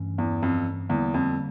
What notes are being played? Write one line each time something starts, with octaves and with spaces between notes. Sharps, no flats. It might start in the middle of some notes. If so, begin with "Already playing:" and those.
Already playing: G2 E3 A3 C#4
E2
F2
E2 D3 G3 A#3
F2